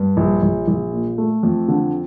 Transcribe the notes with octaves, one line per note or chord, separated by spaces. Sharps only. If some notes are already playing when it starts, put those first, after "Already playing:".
Already playing: G2
A#1
A#1
A#1
A#2
A3
F2
D3